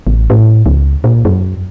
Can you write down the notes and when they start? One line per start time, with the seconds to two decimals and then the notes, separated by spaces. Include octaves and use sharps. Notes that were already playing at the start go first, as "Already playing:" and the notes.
0.07 A1
0.30 A2
0.66 C#2
1.04 A#2
1.25 F#2